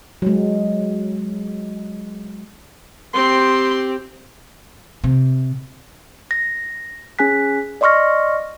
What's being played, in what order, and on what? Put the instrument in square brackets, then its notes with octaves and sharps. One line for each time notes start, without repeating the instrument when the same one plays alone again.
[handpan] F#3 G#3
[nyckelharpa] C4 G4 [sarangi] C6
[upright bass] C3
[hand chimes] A#6
C#4 G#4 G#5 F#6 B6
D5 D#5 C6 C#6 F6 A#6